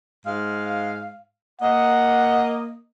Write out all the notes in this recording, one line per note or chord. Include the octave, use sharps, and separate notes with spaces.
G#2 G#3 F5
A#3 D#5 F#5